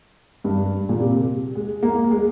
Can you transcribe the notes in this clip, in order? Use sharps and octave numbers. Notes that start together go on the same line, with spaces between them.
G2
A#2
C3
G#3
A#3
G#3